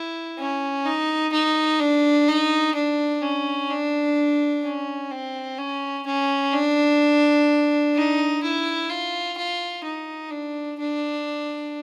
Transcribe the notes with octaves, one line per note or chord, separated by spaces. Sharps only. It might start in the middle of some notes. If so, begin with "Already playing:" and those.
Already playing: E4
C#4
D#4
D#4
D4
D#4
D4
C#4
D4
C#4
C4
C#4
C#4
D4
D#4
E4
F4
F4
D#4
D4
D4